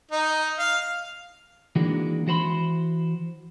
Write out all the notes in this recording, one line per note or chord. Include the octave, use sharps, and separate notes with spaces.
D#4
F5
D#3 E3 G#3 A#3 D4 F#4
E3 F#4 C5 B5 C6